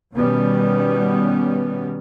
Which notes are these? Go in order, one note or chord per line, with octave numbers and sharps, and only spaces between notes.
B2 D#3 G3 B3 C#4